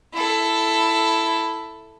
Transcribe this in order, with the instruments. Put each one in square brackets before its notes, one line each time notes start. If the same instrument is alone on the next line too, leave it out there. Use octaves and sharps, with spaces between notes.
[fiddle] E4 A4